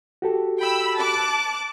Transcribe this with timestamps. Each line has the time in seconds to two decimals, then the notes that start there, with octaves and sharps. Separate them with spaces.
0.22 F#4 G4 A4
0.59 G5 B5 E6
0.98 A5 D6 F#6